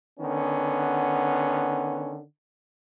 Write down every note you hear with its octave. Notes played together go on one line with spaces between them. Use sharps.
D3 D#3 B3 C#4